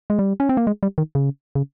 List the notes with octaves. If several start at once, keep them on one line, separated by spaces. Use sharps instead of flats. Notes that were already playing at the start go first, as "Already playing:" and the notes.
G#3
G3
C#4
C4
A#3
G#3
G3
D#3
C#3
C#3